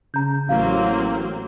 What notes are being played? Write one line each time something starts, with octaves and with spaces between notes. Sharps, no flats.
C#3 A#5 G6
A1 F#3 A#3 C4 F5